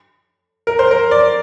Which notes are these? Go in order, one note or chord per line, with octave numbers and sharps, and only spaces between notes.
A#4
C5
A#4
D5